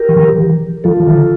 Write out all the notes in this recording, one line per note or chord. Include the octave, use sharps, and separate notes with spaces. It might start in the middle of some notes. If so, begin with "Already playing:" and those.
Already playing: G4 A#4
E3
F3
E3
F3 F4 A4
E3
D3